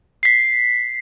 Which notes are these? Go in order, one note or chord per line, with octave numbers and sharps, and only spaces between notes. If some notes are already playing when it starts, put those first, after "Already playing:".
B6 C7